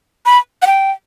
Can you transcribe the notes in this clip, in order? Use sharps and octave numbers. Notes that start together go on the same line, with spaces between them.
B5
F#5
G5